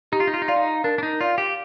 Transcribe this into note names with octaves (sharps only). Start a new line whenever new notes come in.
D#4 G4
F4
D#4
F4
D#4
F4 D5 F5 C6
D#4
D4 A#4
D4
D#4
F4 D5 F5
G4